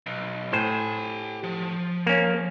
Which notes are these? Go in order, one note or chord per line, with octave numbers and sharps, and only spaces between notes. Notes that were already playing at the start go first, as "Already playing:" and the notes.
B1
A2 G4 C5 G#5
F3
A#3 C#4